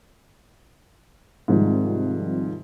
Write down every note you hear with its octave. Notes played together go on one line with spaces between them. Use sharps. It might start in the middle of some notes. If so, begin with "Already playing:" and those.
G#2 C3 D#3 F3 G3